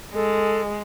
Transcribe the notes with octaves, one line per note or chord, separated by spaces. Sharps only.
G#3 A4